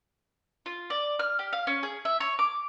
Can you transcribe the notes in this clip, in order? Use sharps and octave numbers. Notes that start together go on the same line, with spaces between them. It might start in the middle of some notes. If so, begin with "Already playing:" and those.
F4
D5
F6
G4
F5
C#4
G#4
E5
C#5
D6